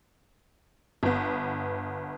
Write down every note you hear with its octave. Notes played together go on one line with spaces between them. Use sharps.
G1 B3